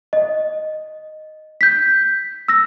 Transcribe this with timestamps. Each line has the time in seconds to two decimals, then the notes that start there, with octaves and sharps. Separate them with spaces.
0.13 D#5
1.61 G6 B6
2.48 E6 A#6